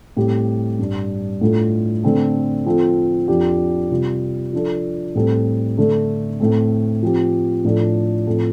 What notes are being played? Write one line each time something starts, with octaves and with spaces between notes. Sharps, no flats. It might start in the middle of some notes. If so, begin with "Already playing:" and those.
A2 G3 C4 G4
G2 G3 D4
A2 A3 D4 F4 A4
D3 A3 C4 A4
F3 C4 F4 A4
F2 F3 D4 G4
C3 G3 F4
F3 D4 A4
A2 G3 C4 A4
D3 A3 D4 A4
A2 A3 C4
F3 C4 G4
A2 F3 D4 A4
A2 F3 C4 A4